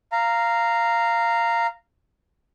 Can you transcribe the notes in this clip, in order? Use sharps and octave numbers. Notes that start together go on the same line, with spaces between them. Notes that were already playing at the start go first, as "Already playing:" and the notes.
F5 A#5